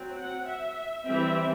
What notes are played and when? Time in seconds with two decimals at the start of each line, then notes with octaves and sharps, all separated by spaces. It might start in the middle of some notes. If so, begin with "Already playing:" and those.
Already playing: F#3 C4
0.18 F#5
0.47 E5
1.06 E3 G3 C4 E5